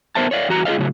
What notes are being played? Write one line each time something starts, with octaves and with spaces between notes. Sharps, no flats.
B3 A#4 C5 E5 A5
C#5 D5 F5
E2 F#4 A#5
F4 G#4 A#4 C5 D#5 F5
A2 C#3 F#3